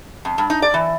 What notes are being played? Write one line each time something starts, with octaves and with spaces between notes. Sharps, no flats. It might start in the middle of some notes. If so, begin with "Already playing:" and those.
F2
G2
D#4
D5
E3